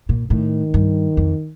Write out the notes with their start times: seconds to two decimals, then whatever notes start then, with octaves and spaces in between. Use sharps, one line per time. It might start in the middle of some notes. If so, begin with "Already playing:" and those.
0.09 A#2
0.30 A2 D#3
0.74 G2
1.17 F2